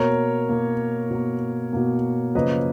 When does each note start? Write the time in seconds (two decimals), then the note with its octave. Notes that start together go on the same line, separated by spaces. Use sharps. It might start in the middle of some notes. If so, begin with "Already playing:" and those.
Already playing: B2 A#3 A#4 C#5
0.49 B2 A#3
1.11 B2 A#3
1.73 B2 A#3
2.35 F#2 C#3 F3 A#3 B4 D#5